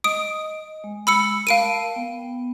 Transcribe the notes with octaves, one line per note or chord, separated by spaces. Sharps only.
D#5 D#6 D7
G#3
B5 E6 C#7
A#4 F5 A5 B5 D7 D#7
B3 G5